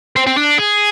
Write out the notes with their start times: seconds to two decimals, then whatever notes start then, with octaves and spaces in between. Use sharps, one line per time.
0.16 C4
0.27 C4
0.37 D4
0.58 G#4